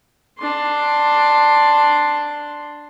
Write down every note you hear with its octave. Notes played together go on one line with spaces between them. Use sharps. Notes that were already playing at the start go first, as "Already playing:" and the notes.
D4 C6